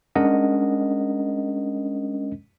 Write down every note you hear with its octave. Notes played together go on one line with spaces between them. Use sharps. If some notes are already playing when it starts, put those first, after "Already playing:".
G#3 C#4 D4 A#4 D#5 F#5